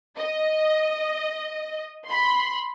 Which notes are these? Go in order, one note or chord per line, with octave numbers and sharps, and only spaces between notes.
D#5
B5 C6